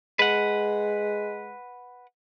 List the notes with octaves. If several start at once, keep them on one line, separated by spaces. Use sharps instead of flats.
G#3 B4 F#5